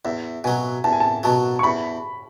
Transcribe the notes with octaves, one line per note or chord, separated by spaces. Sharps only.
E2 E5
B2 F#3 G#5
E2 A5
G#5
A5
B2 F#3 A5
C#6
E2 B5